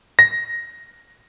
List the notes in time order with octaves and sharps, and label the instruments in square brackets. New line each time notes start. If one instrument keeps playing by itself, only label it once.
[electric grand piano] A#6